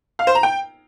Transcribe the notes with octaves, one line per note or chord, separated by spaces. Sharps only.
F5
C5
A#5
G5